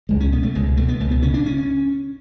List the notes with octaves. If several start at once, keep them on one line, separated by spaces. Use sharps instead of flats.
C#2 G#3
C#4
B2 B3
A3
C#2 G#3
B2 A3
B3
C#2 A3
B3
C#3 C#4
D4
C#4